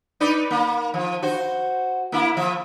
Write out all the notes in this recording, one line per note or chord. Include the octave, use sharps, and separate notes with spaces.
D#4 B4 D5
A#3
F3
F#4 C5
A#3 E4
F3 E5